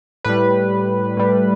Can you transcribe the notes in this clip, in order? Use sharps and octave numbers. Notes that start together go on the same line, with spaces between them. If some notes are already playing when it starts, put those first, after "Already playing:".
A2 G3 B4
A2 G3